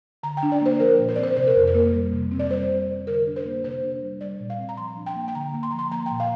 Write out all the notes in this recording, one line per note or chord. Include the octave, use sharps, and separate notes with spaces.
D3 A#5
G5
D4
D5
A#3 C5
F3 A#4
A#2
C5
C4 D5
C5
C3 C5
A#4
F2
A#4
A#3
G3
C3
C4
D5
G3 C5
C3
C4
D3 A#4
D4
C5
A#3
C3 C5
D4
G3
G3 D5
A#2
F5
C4
A#5
F3 C6
D4
G5
A#3
G5
D3 A#5
A#3
C6
F3 A#5
C6
A#3 A#5
A#2 G5
F5